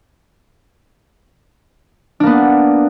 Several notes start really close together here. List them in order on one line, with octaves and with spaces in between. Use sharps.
D4 A#3 B3